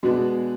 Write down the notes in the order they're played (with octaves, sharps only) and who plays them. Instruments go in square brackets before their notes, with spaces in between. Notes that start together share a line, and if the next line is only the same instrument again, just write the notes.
[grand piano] B2 G#3 B3 D4 [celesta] F#4